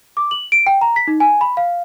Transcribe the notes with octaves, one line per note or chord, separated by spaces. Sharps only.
D6
F#7
D7
G5
A#5
B6
D#4
G#5
B5
F5